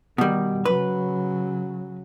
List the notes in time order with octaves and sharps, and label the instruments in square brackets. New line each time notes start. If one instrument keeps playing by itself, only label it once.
[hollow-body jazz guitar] B2 G3 [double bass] D#3
[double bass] C#3 F#3 [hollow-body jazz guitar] B4